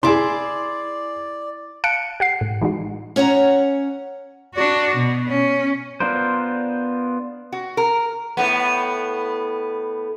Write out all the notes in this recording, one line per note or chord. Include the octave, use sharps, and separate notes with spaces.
E4 G#4 D5 A5 C6 D6
F5 A5 F#6 C#7 D7
G4 F#5 C7
A2
E3 G#3 D#4 F#4
C#4 C#5 F#5 A#5
D4 F#4
B2
C#4
B3 D4 F4 A#4 C5
F#4
A#4
A2 B3